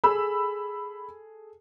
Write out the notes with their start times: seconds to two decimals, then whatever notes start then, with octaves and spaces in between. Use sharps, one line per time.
0.04 G#4 A4 B5 E6